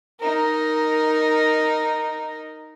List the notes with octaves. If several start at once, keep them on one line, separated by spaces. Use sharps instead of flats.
D#4 A#4